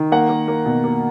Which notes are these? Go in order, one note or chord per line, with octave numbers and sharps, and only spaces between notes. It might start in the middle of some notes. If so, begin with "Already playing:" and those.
Already playing: D#3
A#3 F#5
A#3
A#3
B2
A#3